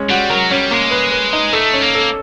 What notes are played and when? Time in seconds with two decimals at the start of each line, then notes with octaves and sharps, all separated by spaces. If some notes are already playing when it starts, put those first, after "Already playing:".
Already playing: G#3 C#4
0.09 G3 F#4
0.30 F#3 A#4
0.50 G3 C#4
0.71 G#3 A#3
0.91 B4
1.12 B4
1.33 D#4
1.53 A3 A4
1.74 C#4
1.81 A#3
1.95 A4